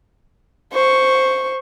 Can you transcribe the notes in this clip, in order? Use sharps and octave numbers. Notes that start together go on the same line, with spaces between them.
C5 C#6